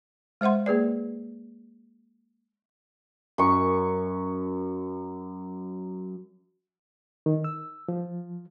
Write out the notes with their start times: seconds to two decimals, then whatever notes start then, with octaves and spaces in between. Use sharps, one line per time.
0.41 G#3 C5 E5 F#5 C6
0.66 A#3 G#4 B4 D5
3.38 F#2 C#6
7.26 D#3
7.44 E6
7.88 F3